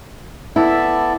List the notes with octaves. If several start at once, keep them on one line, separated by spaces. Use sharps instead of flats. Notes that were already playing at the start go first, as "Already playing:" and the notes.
B3 E4 A4 D5 E5